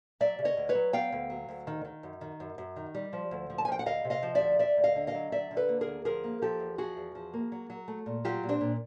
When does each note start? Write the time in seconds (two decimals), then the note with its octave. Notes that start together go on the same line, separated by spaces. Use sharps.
0.20 F#3 D5 E5
0.39 C#3
0.45 C#5 D#5
0.57 D2
0.69 B4 C#5
0.75 F#3
0.93 B3 F5 G5
1.12 D2
1.30 F#3
1.49 D2
1.67 D#3
1.85 D#3
2.03 F#2
2.21 D#3
2.40 F#2
2.58 F#2
2.76 D#3
2.95 G3
3.13 F3
3.31 D2
3.50 F3
3.58 A5
3.65 G#5
3.68 F3 G5
3.79 F#5
3.86 D2 D#5 F5
4.05 C3
4.10 D#5 F5
4.23 F3
4.35 D5 E5
4.41 D2
4.59 D2 D5 E5
4.77 D2
4.84 D#5 F5
4.96 D3
5.07 D#5 F5
5.14 F#3
5.32 D3 D5 E5
5.51 D3
5.57 A4 B4
5.69 A#3
5.81 G#4 A#4
5.87 D2
6.05 F3 G#4 A#4
6.24 A#3
6.42 F3 G4 A4
6.60 E2
6.78 F3 F#4 G#4
6.97 E2
7.15 F3
7.34 A#3
7.52 F#3
7.70 F#3
7.88 A3
8.06 A#2
8.25 F#3 F4 G4
8.43 A#2
8.49 C4 D4
8.61 A#2